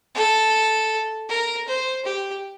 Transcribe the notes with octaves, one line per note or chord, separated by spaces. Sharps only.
A4
A#4
C5
G4